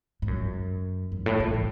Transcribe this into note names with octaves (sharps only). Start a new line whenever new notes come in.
G#2
F#2
F#2
A2
A2
A2